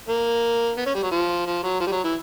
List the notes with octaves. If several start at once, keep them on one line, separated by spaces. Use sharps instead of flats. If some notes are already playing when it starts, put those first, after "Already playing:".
A#3
B3
C#4
G3
F#3
F3
F3
F#3
F3
G3
F#3
E3